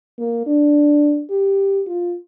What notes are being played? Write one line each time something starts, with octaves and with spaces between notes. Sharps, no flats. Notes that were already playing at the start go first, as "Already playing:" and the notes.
A#3
D4
G4
F4